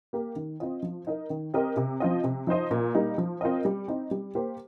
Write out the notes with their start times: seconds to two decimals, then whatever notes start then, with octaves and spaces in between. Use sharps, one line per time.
0.13 A#3 G4 A#4
0.36 D#3
0.60 C4 F4 D#5
0.83 F3
1.07 D#4 A#4 D#5
1.30 D#3
1.54 C4 G4 A#4 D#5
1.77 C3
2.00 F3 C4 F4 D#5
2.24 C3
2.47 F3 D#4 C5 D#5
2.71 A#2
2.94 G3 A#3 D#4
3.18 F3
3.41 C4 F4 A#4 D#5
3.65 G3
3.88 C4 D#4
4.11 G3
4.35 A#3 G4 C5